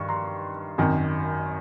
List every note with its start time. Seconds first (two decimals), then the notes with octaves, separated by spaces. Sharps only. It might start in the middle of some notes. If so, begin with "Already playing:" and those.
Already playing: G2 D#3 C#6
0.09 A#5 C6
0.78 G#1 F#2 D#3